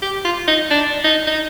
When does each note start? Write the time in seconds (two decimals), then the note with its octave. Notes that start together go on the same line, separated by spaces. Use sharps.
0.02 G4
0.25 F4
0.48 D#4
0.70 D4
1.04 D#4
1.27 D#4